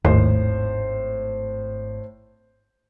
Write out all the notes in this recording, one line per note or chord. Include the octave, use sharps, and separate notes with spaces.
G#1 D#2 A2 C5